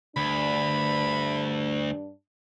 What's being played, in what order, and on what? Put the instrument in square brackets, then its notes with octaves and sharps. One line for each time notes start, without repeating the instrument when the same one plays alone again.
[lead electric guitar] D2 [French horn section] G2 D4 [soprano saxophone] B5